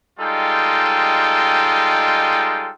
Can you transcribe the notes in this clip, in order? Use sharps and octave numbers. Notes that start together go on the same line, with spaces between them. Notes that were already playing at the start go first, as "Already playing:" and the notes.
G3 G#3 D#4 F4 A4 G5